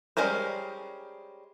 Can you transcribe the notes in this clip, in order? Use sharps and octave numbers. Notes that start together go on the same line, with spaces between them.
G3 G#3 C#4 A#4 C5